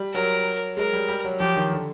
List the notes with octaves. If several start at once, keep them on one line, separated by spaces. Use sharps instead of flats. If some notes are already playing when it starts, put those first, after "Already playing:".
Already playing: G3
F#3 A#4
G#3 A#4
G3
G3
F#3
F3 G4
D#3
D3